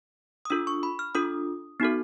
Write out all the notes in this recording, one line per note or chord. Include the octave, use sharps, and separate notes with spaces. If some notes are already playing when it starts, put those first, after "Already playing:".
D#6
D4 F4 A4 E6
C#6
B5
F6
D4 F4 A4 D#6
B3 D#4 F#4 A4